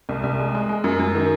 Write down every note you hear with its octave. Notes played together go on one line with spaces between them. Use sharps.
C2
C2
G#3
G#3
G#3
F#2
F#2
D#3